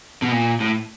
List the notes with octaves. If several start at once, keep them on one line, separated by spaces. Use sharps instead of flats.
B2
A#2
A2